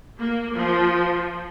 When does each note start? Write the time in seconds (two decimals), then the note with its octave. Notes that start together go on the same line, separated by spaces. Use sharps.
0.19 A#3
0.56 F3